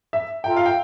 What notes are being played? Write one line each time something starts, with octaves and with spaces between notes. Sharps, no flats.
E5
F4 A4 E5 G5 A#5
F5
G5